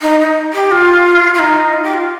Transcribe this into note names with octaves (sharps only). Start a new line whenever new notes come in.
D#4
D#4
G4
F4
F4
D#4
F4
G4
F4